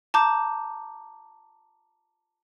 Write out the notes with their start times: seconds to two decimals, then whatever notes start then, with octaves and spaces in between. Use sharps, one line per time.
0.14 A5 A#5 D6 G6